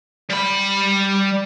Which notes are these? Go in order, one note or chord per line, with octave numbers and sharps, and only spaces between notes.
G3 B5